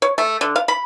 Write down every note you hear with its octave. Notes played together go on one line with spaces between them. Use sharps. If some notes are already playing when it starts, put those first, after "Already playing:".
C#5
A3
D3
F5
B5